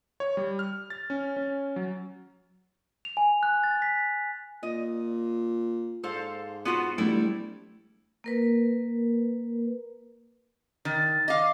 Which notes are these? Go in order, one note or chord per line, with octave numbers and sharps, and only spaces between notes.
C#5
G3
F6
A6
C#4
C#4
F#3
F7
G#5
F#6
A6
B6
A#2 D#5
G#2 A4 C5 F5
B3 F4 F#4
E1 G3 A3 E4
A#3 A#4 B4
D#3 A6
D#5 F5 D6